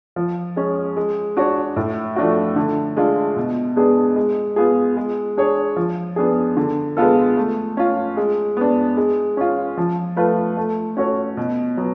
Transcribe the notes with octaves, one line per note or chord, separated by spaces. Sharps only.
F3
G#3 C#4
G#3
D4 F#4 C#5
A2
F3 A3 D4 F#4
D3
G#3 D4 F4
B2
G#3 B3 D4 G#4
G#3
B3 F4 G#4
G#3
D4 G#4 C#5
F3
B3 D4 G#4
D3
G#3 B3 F4 A4
A3
C#4 F4
G#3
B3 D4
G#3
C#4 F4
F3
A3 F4 B4
A3
C#4 F#4 A4 C#5
B2
F#3 B3